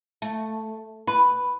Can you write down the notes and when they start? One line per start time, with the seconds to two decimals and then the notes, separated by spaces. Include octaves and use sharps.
0.22 A3
1.07 B4